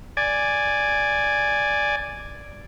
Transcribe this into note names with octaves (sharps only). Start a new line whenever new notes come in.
D5 G#5